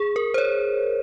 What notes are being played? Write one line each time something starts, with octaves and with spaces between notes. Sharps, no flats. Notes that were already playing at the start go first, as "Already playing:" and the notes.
Already playing: G#4
A#4
C5
C#5